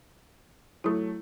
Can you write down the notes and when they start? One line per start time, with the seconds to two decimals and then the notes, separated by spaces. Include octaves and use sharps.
0.84 F#3 A3 E4 D#6